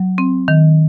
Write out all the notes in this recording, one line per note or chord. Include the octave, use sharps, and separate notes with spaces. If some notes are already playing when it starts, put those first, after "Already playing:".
Already playing: F#3
C4
D#3